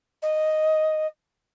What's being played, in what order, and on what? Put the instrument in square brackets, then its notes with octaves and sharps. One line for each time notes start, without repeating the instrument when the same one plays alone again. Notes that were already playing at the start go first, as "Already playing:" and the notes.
[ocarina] D#5